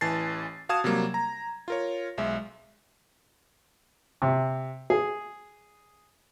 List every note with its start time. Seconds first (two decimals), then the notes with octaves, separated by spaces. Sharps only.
0.01 A1 E3 G#5 A5 A6 C7
0.69 F#4 F5 A5 D#6 G#6 E7
0.84 C3 F#3 G3 A#3
1.14 A#5
1.68 F4 A#4 C#5
2.18 B1 G#3 E5
4.22 C3
4.90 G#4